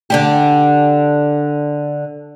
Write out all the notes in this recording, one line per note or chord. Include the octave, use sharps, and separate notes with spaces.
D3 D4 G4